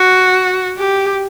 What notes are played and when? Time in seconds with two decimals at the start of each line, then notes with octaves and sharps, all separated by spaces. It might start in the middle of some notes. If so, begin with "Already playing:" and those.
Already playing: F#4
0.79 G4